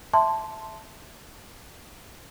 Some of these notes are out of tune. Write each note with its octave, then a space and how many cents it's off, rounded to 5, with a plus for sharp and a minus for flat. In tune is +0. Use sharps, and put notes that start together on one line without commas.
E5 +0 A5 +0 C6 +0